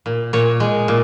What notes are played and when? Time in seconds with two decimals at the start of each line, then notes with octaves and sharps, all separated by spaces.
0.06 A#2
0.33 A#2 C#5
0.60 G#3
0.88 A#2